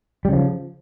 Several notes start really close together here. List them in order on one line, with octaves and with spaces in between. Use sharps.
G3 C#3 F3